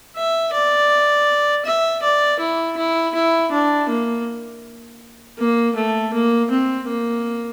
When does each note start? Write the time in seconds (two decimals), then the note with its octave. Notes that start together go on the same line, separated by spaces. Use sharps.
0.16 E5
0.53 D5
1.65 E5
2.03 D5
2.39 E4
2.77 E4
3.15 E4
3.52 D4
3.89 A#3
5.38 A#3
5.75 A3
6.13 A#3
6.50 C4
6.88 A#3